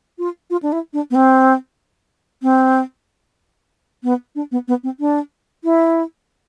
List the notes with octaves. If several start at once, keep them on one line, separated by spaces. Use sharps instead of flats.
F4
F4
D4
E4
D4
B3
C4
C4
B3
D4
B3
B3
C4
D4
E4